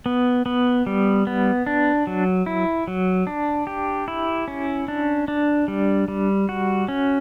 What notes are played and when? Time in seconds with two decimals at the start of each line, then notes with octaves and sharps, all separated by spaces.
0.06 B3
0.46 B3
0.86 G3
1.27 B3
1.66 D4
2.07 F#3
2.46 E4
2.88 F#3
3.27 D4
3.67 G4
4.08 E4
4.48 C#4
4.88 D4
5.28 D4
5.68 G3
6.08 G3
6.49 F#4
6.88 C#4